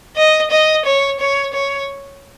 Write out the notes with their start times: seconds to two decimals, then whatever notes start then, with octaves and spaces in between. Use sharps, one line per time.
0.16 D#5
0.51 D#5
0.85 C#5
1.20 C#5
1.54 C#5